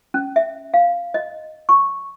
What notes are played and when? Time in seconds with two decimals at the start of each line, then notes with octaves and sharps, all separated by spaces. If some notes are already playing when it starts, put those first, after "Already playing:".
0.14 C#4
0.36 E5
0.74 F5
1.14 D#5
1.69 C#6